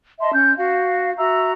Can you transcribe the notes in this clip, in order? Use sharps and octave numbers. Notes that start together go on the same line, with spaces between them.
D#5 E5 A5 C6
C#4 G6
F#4 F5
F#4 E5 A#5 E6